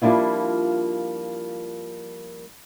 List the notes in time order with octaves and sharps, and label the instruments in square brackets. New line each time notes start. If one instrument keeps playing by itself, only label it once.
[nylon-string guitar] F3 G3 A#3 D4 E4 F4